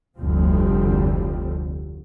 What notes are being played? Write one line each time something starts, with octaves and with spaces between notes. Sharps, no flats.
F1 D2 D3 F3 G3 C4